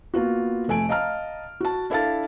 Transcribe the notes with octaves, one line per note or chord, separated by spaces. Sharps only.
A#3 B3 F4 F#4
F1 A3 G#5 D7
D#5 F5 A5 A#5 F6
F#4 A5
D4 E4 A4 F5 A5 A6